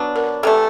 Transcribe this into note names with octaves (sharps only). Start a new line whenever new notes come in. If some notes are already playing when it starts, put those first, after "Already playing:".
Already playing: F#3 B3 D4
A#4
C3 E3 A3 A4